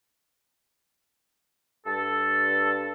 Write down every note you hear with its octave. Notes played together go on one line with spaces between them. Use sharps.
G2 A4